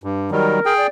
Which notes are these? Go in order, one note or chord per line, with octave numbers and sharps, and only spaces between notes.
G2
D#3 F#3 G3 A#4
G#4 G5
D5